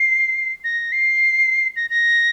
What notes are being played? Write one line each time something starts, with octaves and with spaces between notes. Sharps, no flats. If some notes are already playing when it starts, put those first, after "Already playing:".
Already playing: C7
A#6
C7
A#6
A#6